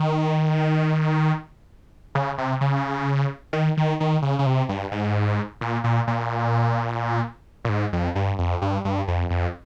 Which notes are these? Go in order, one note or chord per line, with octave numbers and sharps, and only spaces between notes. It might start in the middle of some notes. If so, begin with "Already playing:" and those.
Already playing: D#3
C#3
C3
C#3
D#3
D#3
D#3
C#3
C#3
C3
G2
G#2
A#2
A#2
A#2
A#2
G#2
F2
G2
F2
G2
G2
F2
F2